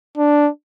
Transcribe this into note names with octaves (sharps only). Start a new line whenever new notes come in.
D4